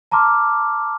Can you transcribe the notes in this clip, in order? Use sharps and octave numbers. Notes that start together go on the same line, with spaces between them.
A5 A#5 C6 D6 F6